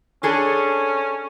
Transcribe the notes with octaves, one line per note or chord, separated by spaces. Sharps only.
C#4 D4 G#4 A4